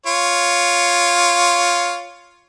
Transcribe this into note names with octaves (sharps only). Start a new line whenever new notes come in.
F4 C#5